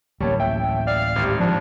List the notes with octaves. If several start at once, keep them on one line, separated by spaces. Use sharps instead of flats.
D1 A1 G3 A#3 C#5 A5
E5 G5
D5 F5 F6
G#1 G4
F3 D4